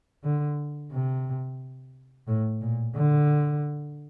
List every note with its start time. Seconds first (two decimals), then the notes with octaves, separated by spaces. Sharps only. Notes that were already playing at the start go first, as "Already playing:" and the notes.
0.24 D3
0.92 C3
2.28 A2
2.61 A#2
2.95 D3